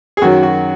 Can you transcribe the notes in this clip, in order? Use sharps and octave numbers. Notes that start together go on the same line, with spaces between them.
G#4
F#2 D#3 F#3 F#4
F#4